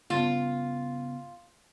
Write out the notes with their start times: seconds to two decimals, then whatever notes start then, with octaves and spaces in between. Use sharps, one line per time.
0.10 G2 C#3 B3 F4